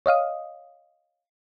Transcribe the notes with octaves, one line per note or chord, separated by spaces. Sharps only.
C#5 D#5 F5 D#6